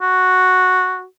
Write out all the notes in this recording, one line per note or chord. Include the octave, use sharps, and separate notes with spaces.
F#4